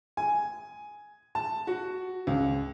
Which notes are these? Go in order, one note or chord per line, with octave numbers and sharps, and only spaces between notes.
G#5
A5
F#4
C#2